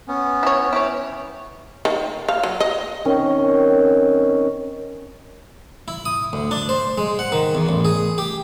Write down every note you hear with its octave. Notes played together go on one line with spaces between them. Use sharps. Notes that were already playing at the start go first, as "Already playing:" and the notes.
B3 C#4
E4 C#5
E4 C#5 G5 B5 D6
D#3
F5
F#3
D#5
D#3 C4 C#4
E4
D#6
D2
D4
C5
G#3
F#5
D#3
E2
A1
G#4
G4